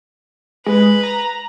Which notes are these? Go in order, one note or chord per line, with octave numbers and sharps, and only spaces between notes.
G#3 B4
A#5